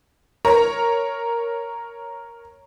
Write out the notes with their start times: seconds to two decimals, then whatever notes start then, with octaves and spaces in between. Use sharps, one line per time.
0.45 A#4 C#5 A#5